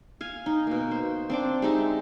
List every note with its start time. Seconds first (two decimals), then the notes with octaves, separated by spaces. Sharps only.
0.21 F5 G#5
0.46 D#4
0.67 B2 A#3
0.91 C5
1.30 C4 D4 D6
1.62 G#3 D#4 G4 E5